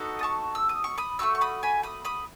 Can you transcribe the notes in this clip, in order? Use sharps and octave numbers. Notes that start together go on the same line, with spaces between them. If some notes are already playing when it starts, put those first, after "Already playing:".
Already playing: B3 D#4 F#4 A4
D#6
A5 C#6
E6
D#6
C#6
B5 D#6
A3 D#4 F#4 C#6 E6
C#6
B5 D#6
G#5 B5
B5 D#6
B5 D#6